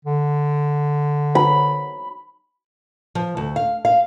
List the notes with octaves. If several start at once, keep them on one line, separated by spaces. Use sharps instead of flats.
D3
B5
F3
D2
F5
F5